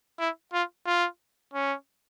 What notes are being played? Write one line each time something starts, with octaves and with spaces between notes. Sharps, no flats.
E4
F4
F4
C#4